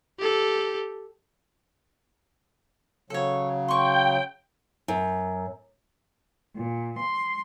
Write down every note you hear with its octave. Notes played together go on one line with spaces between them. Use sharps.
G4 A4
C#3 F#3 A4 C#5
G5 C6 C#6
F#2
A#2
C6